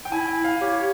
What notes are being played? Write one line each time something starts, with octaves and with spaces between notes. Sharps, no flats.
G5
E4 G#5
F5
G4 C#5